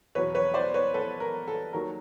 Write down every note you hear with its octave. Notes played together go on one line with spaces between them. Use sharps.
E2 B2 F#3 B4 C#5
B4 C#5
C5 D5
B4 C#5
A4 B4
A#4
A4
D#2 D#3 F#3 A#4